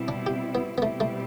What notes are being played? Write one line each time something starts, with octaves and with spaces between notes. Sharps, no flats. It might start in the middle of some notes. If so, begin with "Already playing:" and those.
Already playing: B2 G3 C4 E4
D4
G4
B3
B3
B2 G3 A3 C4 E4
A3